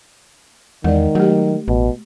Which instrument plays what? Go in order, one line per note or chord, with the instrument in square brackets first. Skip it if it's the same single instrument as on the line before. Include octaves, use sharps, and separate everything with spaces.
[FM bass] E2 [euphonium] D#3 [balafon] G#3 D5
[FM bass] F#3 [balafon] A3 G4
[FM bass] A1 [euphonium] B2